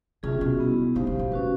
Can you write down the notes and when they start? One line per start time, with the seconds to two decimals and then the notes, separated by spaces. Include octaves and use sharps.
0.23 C3 C#4 F4 G#4
0.41 B2
0.60 G3 B3 E4
0.95 C3 D#4 G4 C5 F5
1.07 C#3
1.19 B2
1.32 A2 C#4 F#4 B4